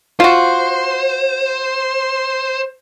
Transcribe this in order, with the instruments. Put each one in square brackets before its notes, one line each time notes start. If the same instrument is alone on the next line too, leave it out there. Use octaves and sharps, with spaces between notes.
[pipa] F4 F#4 [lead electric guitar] C5